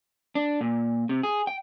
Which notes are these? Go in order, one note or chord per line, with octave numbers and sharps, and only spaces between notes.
D4
A#2
C3
G#4
G5